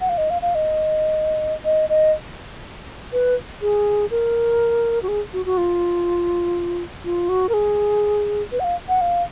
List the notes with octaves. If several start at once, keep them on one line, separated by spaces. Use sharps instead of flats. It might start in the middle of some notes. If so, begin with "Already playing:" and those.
F#5
F5
D#5
F5
F5
D#5
D#5
D#5
B4
G#4
A#4
F#4
G#4
F#4
F#4
F4
F4
F#4
A#4
G#4
B4
F#5
F5
F#5
F5